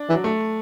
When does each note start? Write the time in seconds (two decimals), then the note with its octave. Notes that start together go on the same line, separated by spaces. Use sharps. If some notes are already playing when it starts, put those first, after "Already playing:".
Already playing: D4
0.09 E3
0.14 F#3
0.24 A3